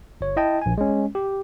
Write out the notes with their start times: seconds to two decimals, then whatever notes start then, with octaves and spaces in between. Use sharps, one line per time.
0.21 G1 C#5
0.36 E4 D#5 G5 A5
0.62 A#1 G#5
0.78 G#3 C#4
1.15 G4